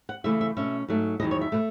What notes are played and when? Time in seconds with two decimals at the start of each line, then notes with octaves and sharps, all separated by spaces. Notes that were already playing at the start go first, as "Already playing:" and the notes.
0.09 F#5
0.24 C#3 E3 A3 E5
0.41 E5
0.57 B2 A3 C#4 E5
0.88 G#2 F#3 A3
1.20 E2 D#5
1.22 D#3 F#3
1.31 C#5
1.41 E5
1.52 B2 A3